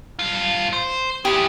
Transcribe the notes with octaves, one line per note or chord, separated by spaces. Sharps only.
G2 F4
C5
E4 G4 G#4